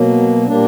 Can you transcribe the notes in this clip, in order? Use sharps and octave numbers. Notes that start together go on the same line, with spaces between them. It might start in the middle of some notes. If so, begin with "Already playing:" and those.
Already playing: B2 F#3 A#3
A#2 G3 A#3 D4